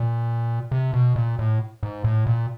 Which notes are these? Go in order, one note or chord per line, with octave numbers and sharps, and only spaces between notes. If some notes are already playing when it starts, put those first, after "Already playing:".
Already playing: A#2
C3
B2
A#2
A2
G#2
A2
A#2